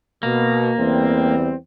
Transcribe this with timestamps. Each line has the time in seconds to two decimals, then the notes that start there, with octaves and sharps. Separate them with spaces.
0.23 B2 A#3
0.78 E2 G3 C4